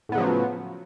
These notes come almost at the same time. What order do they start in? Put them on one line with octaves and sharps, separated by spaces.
A2 B3 C#3 F#3 F3